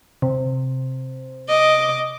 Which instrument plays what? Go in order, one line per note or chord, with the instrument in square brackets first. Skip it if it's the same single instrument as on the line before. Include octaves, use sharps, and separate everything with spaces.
[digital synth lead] C3
[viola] D#5 D6